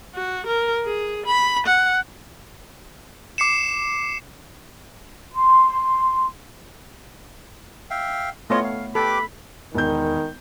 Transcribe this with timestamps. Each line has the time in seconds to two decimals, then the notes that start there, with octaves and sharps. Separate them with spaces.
0.15 F#4
0.46 A#4
0.85 G#4
1.26 B5
1.67 F#5
3.38 D6 C7 C#7 E7
5.33 C6
7.90 E5 F5 G5
8.50 A3 B3 F4 C#5 D#5
8.64 F5
8.95 G4 A4 B4 B5 D6
9.74 E1 D#3 G6